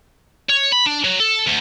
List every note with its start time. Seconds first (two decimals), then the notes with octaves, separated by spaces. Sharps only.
0.49 C#5
0.72 B5
0.86 D4
1.04 F#3
1.20 A4
1.47 D2